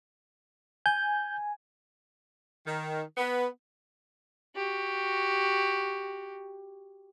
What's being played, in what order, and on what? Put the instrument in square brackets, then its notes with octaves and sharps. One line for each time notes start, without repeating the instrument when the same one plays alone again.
[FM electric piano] G#5 [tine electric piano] G6
[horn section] D#3
B3
[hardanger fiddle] F#4 G4